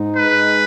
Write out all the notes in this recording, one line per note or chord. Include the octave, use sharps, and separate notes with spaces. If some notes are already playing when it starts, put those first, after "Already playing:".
Already playing: G#2 D#4
G#3 B4